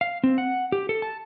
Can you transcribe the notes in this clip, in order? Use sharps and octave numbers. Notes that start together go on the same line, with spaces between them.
F5
C4
F#5
G4
A4
A5